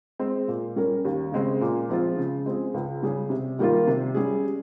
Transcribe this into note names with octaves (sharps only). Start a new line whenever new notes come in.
G#3 C4
A#2
G3 C#4 G4 A#4
D#2
C#3 G#3 C4
A#2
F3 G#3 C4 F4
C#3
G#3 C4 F4 G#4
C#2
C#3 G3 C#4 G#4
C3
D#3 G3 A#3 F4
C3
G3 C#4 G#4